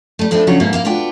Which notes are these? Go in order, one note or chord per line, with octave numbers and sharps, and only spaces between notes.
G3 A3
A2 F3 C4 D4 E4
C#3 F3 F#3 D4 F#4 C#5
G#2 B2 A#3 B3 E4
A#3 E4 F5
B3 D4 F4 F#4 G5